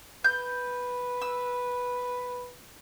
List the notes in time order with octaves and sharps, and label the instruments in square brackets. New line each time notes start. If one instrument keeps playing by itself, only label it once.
[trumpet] B4 [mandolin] G6
[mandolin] E6